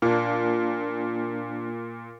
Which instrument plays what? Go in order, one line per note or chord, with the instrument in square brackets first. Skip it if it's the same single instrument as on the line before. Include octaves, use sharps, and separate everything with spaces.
[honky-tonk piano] A#2 [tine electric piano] A#3 D4